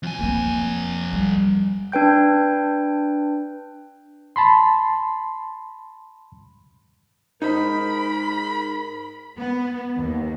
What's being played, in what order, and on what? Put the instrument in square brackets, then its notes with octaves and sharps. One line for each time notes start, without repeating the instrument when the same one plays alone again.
[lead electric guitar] F2 G#5
[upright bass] A#3 C4
G3
[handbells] D4 B4 G5 G6
[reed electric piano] A5 B5 C6
[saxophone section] G#2 A#4 [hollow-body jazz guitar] D#4 C5 D#5 [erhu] B5
[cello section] B3
D#2